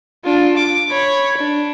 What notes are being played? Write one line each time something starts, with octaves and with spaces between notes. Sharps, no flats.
D4 F4
D6
C#5 B5
D4